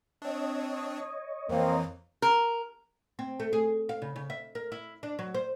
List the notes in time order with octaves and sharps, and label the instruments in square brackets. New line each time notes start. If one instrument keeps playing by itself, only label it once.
[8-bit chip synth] C4 D4 [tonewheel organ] C#5 D#5
[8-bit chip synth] F2 E3 [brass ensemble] A#3 C4
[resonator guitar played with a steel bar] A#4
[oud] C4
A3
G#4
F5
C#3
C#3
E5
A#4
E4
D4
F#3
C5